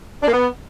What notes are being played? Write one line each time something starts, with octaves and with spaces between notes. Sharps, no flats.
D4
A#3
B3